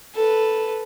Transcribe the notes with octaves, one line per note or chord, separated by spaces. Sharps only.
A4 B4